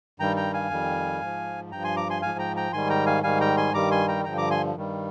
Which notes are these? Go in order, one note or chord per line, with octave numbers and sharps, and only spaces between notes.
G2 D#3 G3 G5 A#5
G5 A#5
F5 G#5
F2 D#3 G3
G#2 F3
G2 F3 G5 A#5
G#5 C6
A#5 D6
G#5 C6
G#2 F3 F5 G#5
G5 A#5
G5 A#5
G#2 D#3 G3 G#5 C6
G5 A#5
F5 G#5
G#2 D#3 G3 F5 G#5
G5 A#5
G#5 C6
G2 D#3 G3 A#5 D6
G#5 C6
G5 A#5
G2 D3 F3 G5 A#5
A#5 D6
G#5 C6
G2 D#3 G3